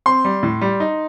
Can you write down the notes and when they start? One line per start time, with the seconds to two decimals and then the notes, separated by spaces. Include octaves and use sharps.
0.06 C4 C6
0.25 G3
0.43 A2
0.61 G3
0.80 D#4